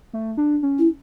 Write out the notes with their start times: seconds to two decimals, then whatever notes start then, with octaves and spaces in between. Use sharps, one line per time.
0.13 A3
0.37 D4
0.63 C#4
0.79 E4